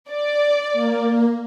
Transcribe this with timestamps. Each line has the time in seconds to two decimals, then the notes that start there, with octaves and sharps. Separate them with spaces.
0.11 D5
0.73 A#3